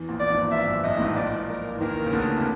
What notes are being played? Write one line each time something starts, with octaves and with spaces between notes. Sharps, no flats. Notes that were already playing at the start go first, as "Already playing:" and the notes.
Already playing: E2 E3
A#1 A#2
D5
G#1 G#2
G2 E5
F#2
G2 D#5
A2
G#1 G#2
A2
A#1 A#2 D5
A#4
E3
D#2 D#3 A#4
C#3
D2 D3
C3